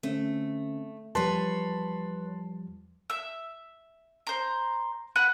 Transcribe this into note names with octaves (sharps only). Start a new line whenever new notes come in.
D3 A3 C4 C#4
E2 F3 G3 B4 C#5 A5 C6
E5 E6
C5 A#5
B4 F#5 B5 F#6